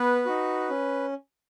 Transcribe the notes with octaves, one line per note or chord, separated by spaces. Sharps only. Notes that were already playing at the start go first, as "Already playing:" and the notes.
Already playing: B3 B4
D#4 F#4
C#4